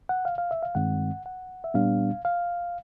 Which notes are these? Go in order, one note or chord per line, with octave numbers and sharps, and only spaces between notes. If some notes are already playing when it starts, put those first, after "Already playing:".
F#5
F5
F5
E5
F5
G2 D#3 G#3 C4 F#5
F#5
E5
A#2 G3 B3 D4 F5
F5